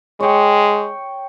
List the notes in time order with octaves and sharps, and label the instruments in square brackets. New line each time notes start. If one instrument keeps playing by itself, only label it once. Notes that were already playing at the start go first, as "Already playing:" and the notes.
[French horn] G#3 [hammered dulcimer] C#5 G5